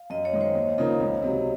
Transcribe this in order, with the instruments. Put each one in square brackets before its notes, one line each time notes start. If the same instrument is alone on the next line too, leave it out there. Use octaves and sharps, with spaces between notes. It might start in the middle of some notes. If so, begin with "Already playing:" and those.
Already playing: [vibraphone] F5
[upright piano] F#2 [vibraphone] D#5
[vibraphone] C#5
[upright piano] D#3 G#3
[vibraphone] C5
[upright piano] D#2
C#3 F3 A#3 D#4
C#2
C3 F#3